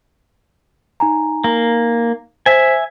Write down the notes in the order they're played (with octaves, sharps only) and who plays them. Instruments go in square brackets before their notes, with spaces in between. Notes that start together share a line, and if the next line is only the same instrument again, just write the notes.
[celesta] D#4 G#5 A#5
[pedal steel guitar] A#3
[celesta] C5 B6 [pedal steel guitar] E5 G#5